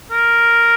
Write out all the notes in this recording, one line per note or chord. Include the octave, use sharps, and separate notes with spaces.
A#4